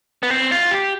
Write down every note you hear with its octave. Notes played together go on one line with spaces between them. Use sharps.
B3
C4
F4
G4